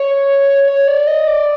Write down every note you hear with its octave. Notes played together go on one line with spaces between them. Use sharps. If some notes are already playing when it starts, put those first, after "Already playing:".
Already playing: C#5
C#5
D5
D#5
D5